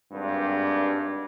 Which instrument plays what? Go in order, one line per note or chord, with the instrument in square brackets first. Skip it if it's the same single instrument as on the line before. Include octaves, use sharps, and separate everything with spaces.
[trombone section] G#1 G2